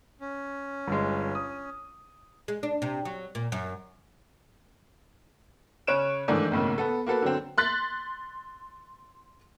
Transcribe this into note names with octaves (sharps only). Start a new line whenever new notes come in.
C#4
G1 G#3
D#6
G#3
D4
C3
F#3
A#2
F#2
C#3 C#4 C#5 F#6 D7 E7
G#2 D#3 E3 A3 D4
B1 A2 C#3 A#3
B3 A4
A#3 F#4 A4 B4
D3 F#3 C4
C6 F#6 A6 B6